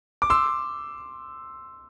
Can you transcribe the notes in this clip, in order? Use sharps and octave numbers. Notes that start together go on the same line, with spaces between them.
D6
C6 E6